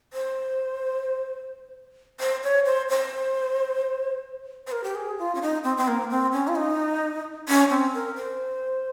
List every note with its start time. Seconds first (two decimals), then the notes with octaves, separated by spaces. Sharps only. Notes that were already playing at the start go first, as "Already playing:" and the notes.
0.13 C5
2.20 C5
2.44 C#5
2.66 C5
2.90 C5
4.67 C5
4.72 A#4
4.84 G4
4.95 G#4
5.19 F4
5.35 C#4
5.42 D#4
5.64 C4
5.77 C4
5.88 A#3
6.11 C4
6.32 C#4
6.48 F4
6.55 D#4
7.48 C#4
7.70 C4
7.94 A#4
8.16 C5